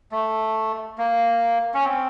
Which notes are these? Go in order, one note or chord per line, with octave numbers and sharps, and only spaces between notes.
A3
A#3
C#4
C4